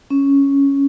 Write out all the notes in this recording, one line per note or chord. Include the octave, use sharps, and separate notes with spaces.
C#4